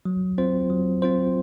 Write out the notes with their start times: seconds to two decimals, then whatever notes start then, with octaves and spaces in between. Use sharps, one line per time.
0.05 F#3
0.38 C4 F4 C5
0.70 F#3
1.02 C4 F4 C5